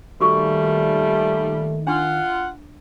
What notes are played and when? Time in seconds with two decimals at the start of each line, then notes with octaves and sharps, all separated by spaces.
0.21 A#2 D#3 G3 A3 F#4 A4 C#6
1.87 D4 F4 F#5